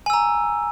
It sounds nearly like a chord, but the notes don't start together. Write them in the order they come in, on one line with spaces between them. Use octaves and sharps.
G#5 E6 A#5